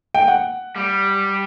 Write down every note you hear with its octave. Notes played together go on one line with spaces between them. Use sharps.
G5
F#5
G3